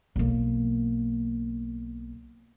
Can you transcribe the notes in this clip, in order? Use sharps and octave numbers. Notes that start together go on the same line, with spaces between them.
B1 A#3